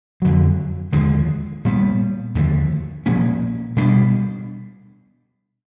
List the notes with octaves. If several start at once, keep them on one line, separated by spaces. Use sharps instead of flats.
F2 D3 F#3
D#2 D3 F3 G#3
A#2 G3 B3
D#2 D3 F3 A3
A#2 F3 A#3 C#4
B2 G3 B3 D4